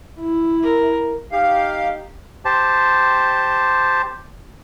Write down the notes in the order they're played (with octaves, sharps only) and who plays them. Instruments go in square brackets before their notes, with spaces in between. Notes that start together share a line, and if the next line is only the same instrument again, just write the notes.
[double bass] E4
[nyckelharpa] A#4
[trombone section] D#4 G4 [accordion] F5
[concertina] G4 C5 A5